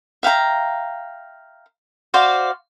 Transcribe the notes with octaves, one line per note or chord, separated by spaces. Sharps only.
E5 F5 G5 A#5
F#4 C5 D5 F5